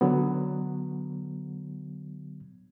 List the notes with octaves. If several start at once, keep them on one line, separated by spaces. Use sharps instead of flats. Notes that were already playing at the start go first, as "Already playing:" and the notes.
D3 F#3 B3